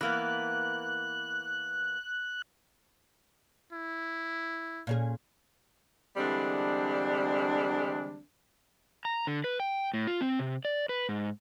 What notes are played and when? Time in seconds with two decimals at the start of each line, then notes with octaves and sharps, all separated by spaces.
0.01 E3 A#3 B3 F#6
3.73 E4
4.87 A#2 C#4 G#4
6.17 D3 E3 G3 G#3 C4 D4
9.05 A#5
9.27 D3
9.44 B4
9.60 G5
9.94 A2
10.07 F4
10.21 C4
10.39 C3
10.65 D5
10.89 B4
11.09 G#2